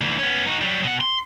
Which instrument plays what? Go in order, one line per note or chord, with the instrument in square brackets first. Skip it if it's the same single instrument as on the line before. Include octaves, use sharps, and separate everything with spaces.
[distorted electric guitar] D2 E3
B3 C#4
D#4 F#4
F#3 G3
B2 F#5
C6